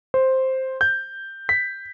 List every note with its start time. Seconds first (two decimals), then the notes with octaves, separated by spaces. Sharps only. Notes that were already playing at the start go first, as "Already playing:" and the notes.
0.14 C5
0.81 G6
1.49 B6